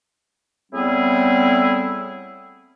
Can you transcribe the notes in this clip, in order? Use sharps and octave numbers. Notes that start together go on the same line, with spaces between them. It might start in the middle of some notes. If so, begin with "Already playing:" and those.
A2 G3 B3 C4 E4 G#4